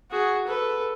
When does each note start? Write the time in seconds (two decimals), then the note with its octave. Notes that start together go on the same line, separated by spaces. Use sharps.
0.11 F#4 G#4
0.47 A4 B4